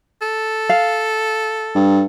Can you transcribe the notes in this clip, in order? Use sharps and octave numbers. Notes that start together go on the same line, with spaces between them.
A4
F5
G2